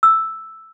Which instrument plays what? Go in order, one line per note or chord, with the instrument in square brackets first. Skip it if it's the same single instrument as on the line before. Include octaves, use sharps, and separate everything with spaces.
[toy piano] E6